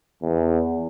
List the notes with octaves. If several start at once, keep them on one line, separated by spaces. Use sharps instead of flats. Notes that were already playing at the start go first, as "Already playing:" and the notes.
E2